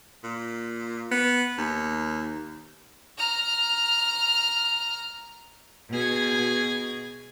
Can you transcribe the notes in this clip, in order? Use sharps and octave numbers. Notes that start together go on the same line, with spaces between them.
A#2
B3
D#2
A#5 F6
B2 G#4 G#6